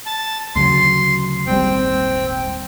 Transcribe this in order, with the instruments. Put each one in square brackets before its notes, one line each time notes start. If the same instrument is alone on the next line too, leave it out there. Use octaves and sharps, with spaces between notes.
[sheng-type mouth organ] A5
[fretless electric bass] D2 C#3 F#3 [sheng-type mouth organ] C6
[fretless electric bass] D#1 G#1 G3 [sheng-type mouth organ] C4 G5